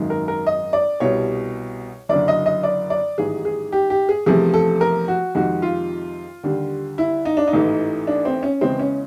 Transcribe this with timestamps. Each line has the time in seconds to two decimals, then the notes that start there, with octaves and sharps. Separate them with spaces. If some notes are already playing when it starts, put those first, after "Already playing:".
Already playing: G#1 F#2 D#3 G#3
0.10 A#4
0.28 A#4
0.47 D#5
0.73 D5
1.00 C2 B2 G3 C#5
2.09 F#1 F#2 D3 D5
2.28 D#5
2.46 D#5
2.63 D5
2.90 D5
3.18 A1 G#2 D#3 G3 G#4
3.45 G#4
3.72 G4
3.90 G4
4.09 G#4
4.26 E2 C3 F3 A3 G#4
4.54 A4
4.81 A#4
5.08 F#4
5.35 F2 C3 D#3 G#3 F#4
5.62 F4
6.44 D#2 D3 G3
6.98 E4
7.25 D#4
7.37 D4
7.47 D#4
7.53 A1 G#2 E3 A3
8.07 D4
8.25 C4
8.43 C#4
8.61 E2 C#3 E3 G#3 C4
8.79 C#4